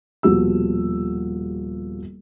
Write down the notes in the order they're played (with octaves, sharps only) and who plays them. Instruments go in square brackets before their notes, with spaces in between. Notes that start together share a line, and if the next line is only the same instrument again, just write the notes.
[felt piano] D#1 B2 F3 F#4 G4 E6